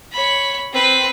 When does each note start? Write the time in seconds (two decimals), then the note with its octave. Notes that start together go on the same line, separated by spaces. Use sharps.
0.12 C#5 B5
0.72 C4 B4